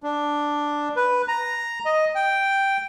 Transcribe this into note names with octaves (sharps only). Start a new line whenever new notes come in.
D4
B4
A#5
D#5
G5